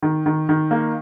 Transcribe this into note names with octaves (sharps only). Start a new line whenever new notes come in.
D#3
D#3
D#3
A#3